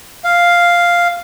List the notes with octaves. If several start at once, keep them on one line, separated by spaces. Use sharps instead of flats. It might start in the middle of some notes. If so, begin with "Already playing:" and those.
F5